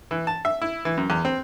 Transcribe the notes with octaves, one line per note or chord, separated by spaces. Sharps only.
E3
A5
E5
E4
E3
F#2
E2
C4